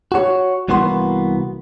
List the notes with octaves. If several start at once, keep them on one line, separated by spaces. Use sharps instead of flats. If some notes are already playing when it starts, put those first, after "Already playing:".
F#4 C#5
C2 E3 A#3 B3 F#4 C6